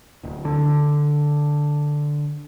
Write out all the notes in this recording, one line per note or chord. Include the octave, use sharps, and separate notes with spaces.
D1
D3